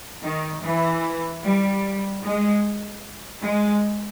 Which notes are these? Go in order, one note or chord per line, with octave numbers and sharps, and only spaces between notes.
D#3
E3
G3
G#3
G#3